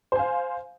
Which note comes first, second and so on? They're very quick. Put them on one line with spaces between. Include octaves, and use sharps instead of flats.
C5 G#5 F5